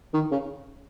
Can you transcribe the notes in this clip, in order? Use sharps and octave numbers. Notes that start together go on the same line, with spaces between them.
D#3
C#3